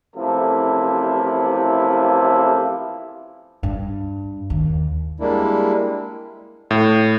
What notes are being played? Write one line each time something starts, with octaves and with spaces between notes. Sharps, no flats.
A1 C3 F3 A#3 E4 A4
G2
D#2
G3 G#3 A#3 D4 E4
A2